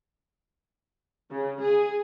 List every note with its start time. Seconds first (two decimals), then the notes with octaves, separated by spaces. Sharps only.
1.30 C#3
1.60 G#4